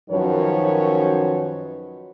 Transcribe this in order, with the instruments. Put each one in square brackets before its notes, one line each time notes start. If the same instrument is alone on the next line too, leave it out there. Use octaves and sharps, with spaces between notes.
[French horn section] F#2 D#3 F3 F#4 B4 C#5